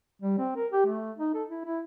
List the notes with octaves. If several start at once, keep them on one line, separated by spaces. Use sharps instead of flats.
G3
C4
A#4
G4
A3
D#4
A4
E4
E4